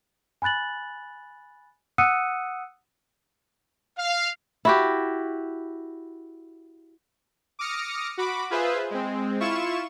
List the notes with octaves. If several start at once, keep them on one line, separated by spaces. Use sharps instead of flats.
G#5 B5 F#6 A6 F#7
F#5 D#6 E6 F#6 C#7 D#7
F5
E4 F#4 G4
D6 D#6 F6 A#6 C#7
F#4 B5 D6
F4 G#4 B4 C5 E5
G#3 C4
E4 F4 C#6 E7